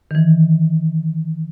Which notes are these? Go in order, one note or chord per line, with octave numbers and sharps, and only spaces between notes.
D#3 E3